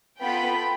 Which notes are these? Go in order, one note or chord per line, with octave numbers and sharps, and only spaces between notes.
B3 F4 A4 G5 B5